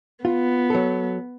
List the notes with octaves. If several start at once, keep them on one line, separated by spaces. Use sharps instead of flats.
B3 F4
F#3 A4